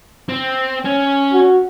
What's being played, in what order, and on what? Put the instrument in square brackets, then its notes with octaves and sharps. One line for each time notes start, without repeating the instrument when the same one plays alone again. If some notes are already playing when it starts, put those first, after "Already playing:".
[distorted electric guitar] C4
C#4
[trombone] F#4